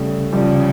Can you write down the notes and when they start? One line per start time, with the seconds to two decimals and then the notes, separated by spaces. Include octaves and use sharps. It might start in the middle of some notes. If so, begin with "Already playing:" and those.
Already playing: C#3 G3 A3
0.33 C#3 F3 G3